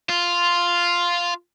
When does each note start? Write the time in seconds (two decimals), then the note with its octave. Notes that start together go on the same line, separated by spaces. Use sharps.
0.09 F4